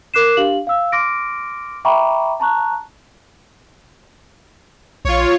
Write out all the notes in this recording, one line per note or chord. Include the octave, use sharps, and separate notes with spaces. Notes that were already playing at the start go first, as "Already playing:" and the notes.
A#4 D6 F#6 C7 E7
D4 G4 F5 F#7
F5 E6
C6 D6 F6 A#6 D7
E5 G5 A#5 B5 C#6 D6
A5 A#5 C#6 F#6
A#1 F4 C#5